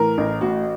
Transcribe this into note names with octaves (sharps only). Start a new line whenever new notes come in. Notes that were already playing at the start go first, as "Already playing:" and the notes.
Already playing: A2 E3 A#4
A1
A2 F#4